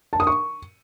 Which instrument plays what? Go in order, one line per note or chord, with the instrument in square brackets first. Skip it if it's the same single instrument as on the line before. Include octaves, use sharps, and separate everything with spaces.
[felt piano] A5
D#6
C#6